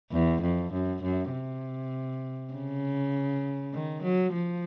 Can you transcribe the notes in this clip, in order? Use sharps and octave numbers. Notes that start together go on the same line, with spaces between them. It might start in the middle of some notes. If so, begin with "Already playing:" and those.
E2
F2
F#2
F#2
C3
C#3
D#3
F#3
F3